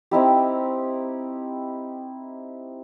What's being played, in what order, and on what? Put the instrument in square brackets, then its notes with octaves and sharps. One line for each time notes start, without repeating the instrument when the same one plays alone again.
[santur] C4 D#4 E4 G4